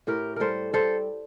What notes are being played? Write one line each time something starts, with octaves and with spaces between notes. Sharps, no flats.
A2 G4 A#4
G3 A4 A#4 C5
G3 A4 C5